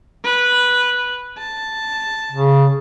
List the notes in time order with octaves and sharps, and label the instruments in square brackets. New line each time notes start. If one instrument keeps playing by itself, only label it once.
[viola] B4
A5
[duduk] C#3